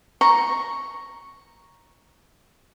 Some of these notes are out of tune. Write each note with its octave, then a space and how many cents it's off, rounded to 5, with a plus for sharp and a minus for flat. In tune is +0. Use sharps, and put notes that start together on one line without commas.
A#5 +0 C#6 +0